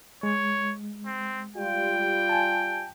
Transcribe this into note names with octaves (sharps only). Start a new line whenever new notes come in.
G#3 C#5
C4
G3 F4 G5
G#5 A5